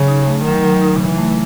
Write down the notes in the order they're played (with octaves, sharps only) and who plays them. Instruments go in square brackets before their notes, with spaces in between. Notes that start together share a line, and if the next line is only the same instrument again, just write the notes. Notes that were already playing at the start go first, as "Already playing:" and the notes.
Already playing: [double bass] C#3 [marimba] F#3
[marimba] D#4
A3
[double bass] D#3 [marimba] F#3
[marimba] F#3
D#4
[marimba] C#3 [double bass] E3
[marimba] A3